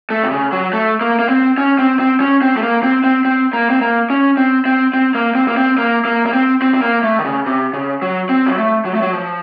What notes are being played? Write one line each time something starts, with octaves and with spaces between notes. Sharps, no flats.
A3
C3
C#3
F#3
A3
A#3
A#3
C4
C#4
C4
C4
C#4
C4
A3
A#3
C4
C4
C4
A#3
C4
A#3
C#4
C4
C4
C4
A#3
C4
A#3
C4
A#3
A#3
A#3
C4
C4
C4
A#3
A3
D#3
C#3
C3
C#3
F#3
C4
F#3
A3
F#3
A3
F#3
F3